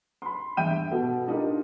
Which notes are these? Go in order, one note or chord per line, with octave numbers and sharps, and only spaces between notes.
B5 C6
E2 G2 E5 G5 G6 D#7
B2 A4
D4 D#4 F4 G4 A#4